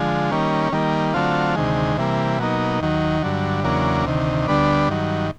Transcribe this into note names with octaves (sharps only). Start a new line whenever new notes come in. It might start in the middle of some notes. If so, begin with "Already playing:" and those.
Already playing: D3 F3 G#3
D#3 G3 A#3 C#4
D#3 G3 A#3
D3 F#3 A3 C4 F4
D2 C3 D#3 G#3
C3 E3 G3 A#3
B2 F#3 A#3 D#4
D#2 D#3 F#3
G2 D3 F#3
E2 C#3 F#3 A#3 D4
D2 C3 D#3
D2 D3 G3 B3 D4
G2 D#3 F#3